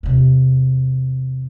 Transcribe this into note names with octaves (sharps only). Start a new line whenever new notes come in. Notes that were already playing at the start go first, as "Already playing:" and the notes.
E2 C3